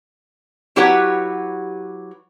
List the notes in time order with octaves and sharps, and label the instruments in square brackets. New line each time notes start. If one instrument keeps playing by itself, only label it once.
[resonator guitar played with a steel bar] F#3 E4 G4 B4 C#5 F#5